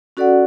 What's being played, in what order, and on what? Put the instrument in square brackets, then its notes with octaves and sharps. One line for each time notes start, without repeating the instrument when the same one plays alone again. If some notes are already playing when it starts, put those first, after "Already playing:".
[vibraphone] C#4 F#4 A4 D5 F#5